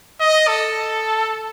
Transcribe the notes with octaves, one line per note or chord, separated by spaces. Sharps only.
D#5
A4